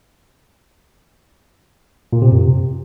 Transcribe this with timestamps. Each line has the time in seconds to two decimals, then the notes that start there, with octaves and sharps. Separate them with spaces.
2.13 A#2
2.22 C3
2.31 F#2
2.41 C3